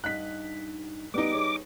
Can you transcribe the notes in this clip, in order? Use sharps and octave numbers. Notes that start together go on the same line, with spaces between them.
G2 D#4 F#5 F#6 B6
G3 B3 D#4 D6
G#4 C#5